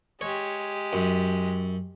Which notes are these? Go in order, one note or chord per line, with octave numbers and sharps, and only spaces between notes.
G#3 G4 C#5
F#2